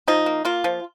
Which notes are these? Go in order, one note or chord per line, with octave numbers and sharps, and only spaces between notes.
F3 D#4
A#3
A#3 F4
F3